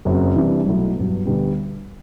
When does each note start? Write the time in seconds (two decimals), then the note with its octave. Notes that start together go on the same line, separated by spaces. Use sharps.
0.05 F#1 F#2 F#3 C4
0.35 C3 E3 G3 D4
0.66 B1 B2 F#3 A3 E4
0.95 G2 F#3 B3
1.25 D2 D3 G3 B3